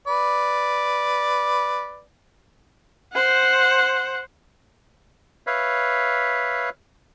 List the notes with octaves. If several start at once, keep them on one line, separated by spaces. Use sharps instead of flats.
B4 D5
C5 F#5
B4 C#5 E5 F5